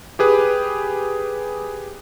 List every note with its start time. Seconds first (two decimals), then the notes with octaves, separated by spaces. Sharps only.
0.19 G4 G#4 B4